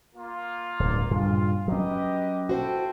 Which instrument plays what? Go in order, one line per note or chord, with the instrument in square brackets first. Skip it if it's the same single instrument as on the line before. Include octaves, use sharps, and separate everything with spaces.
[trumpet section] A#3 F4
[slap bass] D1 G2
[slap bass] G2 A#2 C#3 [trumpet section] F4
[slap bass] F#3 C#4 [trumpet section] G4 B4 D#5
[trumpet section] E4 A4 G5 [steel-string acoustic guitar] F#4 C5